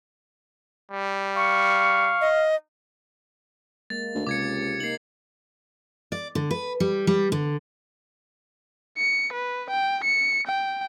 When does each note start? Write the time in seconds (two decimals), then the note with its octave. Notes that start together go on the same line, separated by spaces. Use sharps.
0.92 G3
1.36 F5 C#6
2.21 D#5
3.90 G#3 A#3 A6
4.15 D2
4.27 C#2 C3 D6 G#6 C#7
4.80 A#3 D#4 C7 F#7
6.12 D5
6.35 D3
6.51 B4
6.80 G3
7.07 G3
7.32 D3
8.98 C#7
9.33 B4
9.70 G5
10.04 C#7
10.47 G5